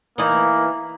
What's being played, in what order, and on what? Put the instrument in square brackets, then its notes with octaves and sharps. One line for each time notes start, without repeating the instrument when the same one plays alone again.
[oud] E3 D#4 [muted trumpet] A#3